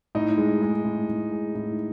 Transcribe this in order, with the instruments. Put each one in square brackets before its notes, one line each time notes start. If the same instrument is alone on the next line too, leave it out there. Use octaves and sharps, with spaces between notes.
[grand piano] A2 D#4
G#3
G#3
A2
A2
G#3
A2